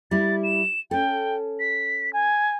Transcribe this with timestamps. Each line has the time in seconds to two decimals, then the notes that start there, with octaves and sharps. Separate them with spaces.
0.11 G3 E4 A6
0.43 E7
0.91 C#4 A4 G5
1.59 B6
2.13 G#5